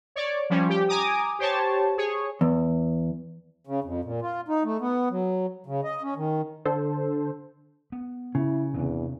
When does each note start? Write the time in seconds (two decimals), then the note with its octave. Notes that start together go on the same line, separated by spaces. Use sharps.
0.16 C#5 D5
0.50 F3 G3 C#4
0.69 G4
0.89 G#5 A#5 D6 D#6
1.39 G4 C5 C#5 A5
1.97 G#4 C#5
2.41 E2
3.67 C#3
3.84 F2
4.05 A#2
4.22 F4
4.48 D#4
4.64 A3
4.81 B3
5.10 F#3
5.66 C#3
5.84 D#5
6.03 C#4
6.16 D#3
6.65 D3 A4 C5
7.92 B3
8.35 C#3 E4
8.74 E2 C3 C4 D4